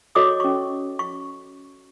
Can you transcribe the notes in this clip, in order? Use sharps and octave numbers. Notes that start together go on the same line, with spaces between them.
F#4 A4 C#5 D#5 D6 D#6
C#4 C#6
C#6